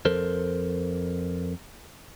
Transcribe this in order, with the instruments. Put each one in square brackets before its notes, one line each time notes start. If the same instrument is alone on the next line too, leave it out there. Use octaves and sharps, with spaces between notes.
[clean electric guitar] F2 A4 A#4 C5